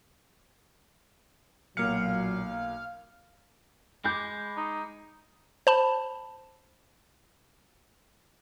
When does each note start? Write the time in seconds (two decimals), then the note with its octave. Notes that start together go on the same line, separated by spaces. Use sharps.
1.77 B1 A#2 F#3 A#3 F5 C#7
4.04 G#3 B5 D6 G6
4.57 D#4
5.67 C5 A5 B5